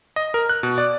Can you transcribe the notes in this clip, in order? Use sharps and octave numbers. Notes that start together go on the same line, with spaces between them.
D#5
A#4
F#6
B2
D5